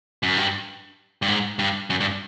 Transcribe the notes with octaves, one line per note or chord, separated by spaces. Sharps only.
F#2
G2
G2
G#2
G2
F#2
G2